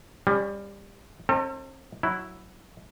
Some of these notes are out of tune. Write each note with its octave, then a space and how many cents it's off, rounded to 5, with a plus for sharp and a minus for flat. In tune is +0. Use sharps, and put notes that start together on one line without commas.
G3 +25 C#4 +0
C4 +40 D#4 -10 A4 +40
F#3 +0 E4 +0